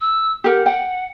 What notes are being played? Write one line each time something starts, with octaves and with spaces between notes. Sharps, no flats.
E6
G4 A#4 F#5
F#5 G5